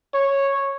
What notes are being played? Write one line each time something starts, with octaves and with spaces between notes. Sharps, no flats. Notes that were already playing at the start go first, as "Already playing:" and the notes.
C#5